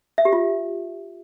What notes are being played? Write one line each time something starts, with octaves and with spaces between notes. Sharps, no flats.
E5
G4
F4